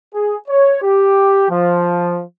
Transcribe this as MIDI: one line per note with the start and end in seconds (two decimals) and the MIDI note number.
0.15 0.37 68
0.49 0.79 73
0.83 1.47 67
1.50 2.23 53